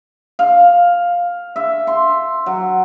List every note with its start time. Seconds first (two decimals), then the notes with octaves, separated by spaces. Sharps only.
0.39 F5
1.56 E5
1.87 C6
2.46 F#3